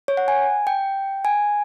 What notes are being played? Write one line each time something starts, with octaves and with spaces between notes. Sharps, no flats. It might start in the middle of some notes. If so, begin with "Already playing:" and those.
C#5
F#5
G#5
G5
G#5